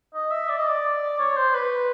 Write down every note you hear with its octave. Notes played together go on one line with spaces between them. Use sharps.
D#5
E5
D5
D#5
D5
C#5
C5
B4